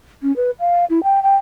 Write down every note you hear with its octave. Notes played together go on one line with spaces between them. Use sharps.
C#4
B4
F5
E4
G5
G5